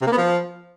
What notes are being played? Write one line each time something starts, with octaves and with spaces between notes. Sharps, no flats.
C3
A#3
B3
F3